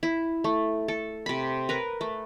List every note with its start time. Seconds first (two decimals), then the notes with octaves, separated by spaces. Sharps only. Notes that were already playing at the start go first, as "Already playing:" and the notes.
0.03 E4
0.44 A3
0.88 A4
1.26 C3 B5
1.69 A#4 B4
2.01 A3